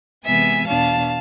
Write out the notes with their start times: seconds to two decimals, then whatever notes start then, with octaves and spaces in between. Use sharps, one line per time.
0.25 C3 E3 G#3 B3 E5 G#5
0.67 E2 B2 B3 D4 F5 A5